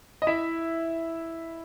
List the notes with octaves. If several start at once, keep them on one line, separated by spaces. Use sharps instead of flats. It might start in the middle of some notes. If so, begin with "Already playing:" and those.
D#5
E4 E5